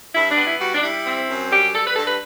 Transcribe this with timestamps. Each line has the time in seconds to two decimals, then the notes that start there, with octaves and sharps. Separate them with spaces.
0.14 G2 E4
0.30 D4
0.37 B3
0.45 E4
0.60 G3 F#4
0.74 D4
0.83 G3 E4
1.06 C4
1.28 F#2
1.51 G3 G4
1.73 G3 A4
1.85 B4
1.96 G2 A4
2.06 B4